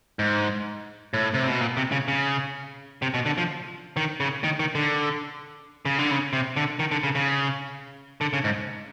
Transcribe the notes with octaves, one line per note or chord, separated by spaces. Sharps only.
G#2
A2
C3
B2
A#2
C3
C#3
C#3
C3
B2
D3
F3
D#3
C#3
D#3
D#3
D3
C#3
D3
C#3
C3
D3
D#3
D3
C#3
C#3
D3
C#3
G#2